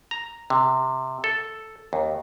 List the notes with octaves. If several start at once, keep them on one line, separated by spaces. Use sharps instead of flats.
A#5
C3
A4
D#2